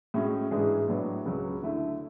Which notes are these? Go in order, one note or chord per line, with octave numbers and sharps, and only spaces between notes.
A2 G#3 C#4 F#4
G#2 E3 G#3 D4 G#4
A2 F#3 B3 D4
C#2 C#3 F#3
D3 A3 E4